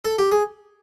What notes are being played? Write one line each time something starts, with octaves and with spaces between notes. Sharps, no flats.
A4
G4
G#4